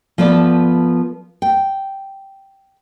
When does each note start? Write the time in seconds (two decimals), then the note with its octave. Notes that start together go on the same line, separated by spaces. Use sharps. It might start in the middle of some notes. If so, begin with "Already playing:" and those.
0.18 F3 B3 A4 D5
1.42 G5